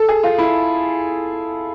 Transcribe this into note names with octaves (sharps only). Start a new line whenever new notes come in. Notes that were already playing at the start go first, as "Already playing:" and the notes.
Already playing: A4
G#4
F4
E4